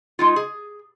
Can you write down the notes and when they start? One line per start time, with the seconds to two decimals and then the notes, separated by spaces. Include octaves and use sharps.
0.19 G#3 D#4 F4
0.36 G#4